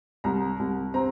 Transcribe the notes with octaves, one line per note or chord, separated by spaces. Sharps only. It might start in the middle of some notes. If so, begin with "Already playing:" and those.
C2 A#5
C2
C4 A#5